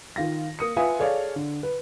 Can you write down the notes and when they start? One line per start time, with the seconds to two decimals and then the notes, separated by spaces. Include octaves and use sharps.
0.16 D#3 F4 A#6
0.59 A#3 D#6 C#7
0.76 F4 B4 E5 G#5 D#6
0.99 G#4 A4 C#5 D5 F5
1.36 D3
1.63 B4